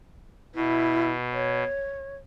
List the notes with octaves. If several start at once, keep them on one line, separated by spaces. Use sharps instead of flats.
B2 E4
C#5